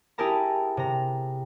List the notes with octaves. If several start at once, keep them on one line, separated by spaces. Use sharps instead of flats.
E4 G4 G#4 A#4 A5 A#5
C3 A#5